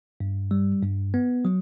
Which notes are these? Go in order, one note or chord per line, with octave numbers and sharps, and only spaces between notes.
G2
G3
G2
B3
F#3